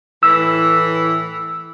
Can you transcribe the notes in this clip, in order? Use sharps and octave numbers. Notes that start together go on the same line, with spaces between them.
A2 E3 E6